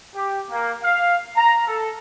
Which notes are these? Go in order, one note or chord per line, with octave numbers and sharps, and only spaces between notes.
G4
A#3
F5
A#5
A4